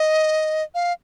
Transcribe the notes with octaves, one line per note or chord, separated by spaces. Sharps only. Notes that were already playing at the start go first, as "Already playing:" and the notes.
Already playing: D#5
F5